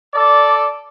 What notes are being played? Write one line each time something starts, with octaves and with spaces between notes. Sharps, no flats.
A4 D5